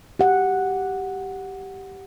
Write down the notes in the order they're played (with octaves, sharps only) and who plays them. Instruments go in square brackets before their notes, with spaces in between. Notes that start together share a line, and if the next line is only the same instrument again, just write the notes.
[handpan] G4 F#5